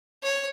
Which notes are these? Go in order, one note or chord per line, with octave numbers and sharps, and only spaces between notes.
C#5